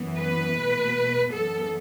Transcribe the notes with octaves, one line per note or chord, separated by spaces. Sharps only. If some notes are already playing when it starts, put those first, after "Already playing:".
Already playing: F#2 E3 B3
B4
B2 A3
F#2 E3 B3 A4